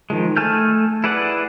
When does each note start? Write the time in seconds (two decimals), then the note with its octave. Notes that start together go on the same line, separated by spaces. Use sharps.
0.10 D#3 F3 G#3
0.37 A3 G#5 A5 F6 G6
1.04 E4 G#4 B4 D5 F#5